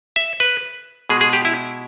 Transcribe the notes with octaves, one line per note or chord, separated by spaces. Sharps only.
E5
B4
B2 G#3 G#4
G#4
G4
E4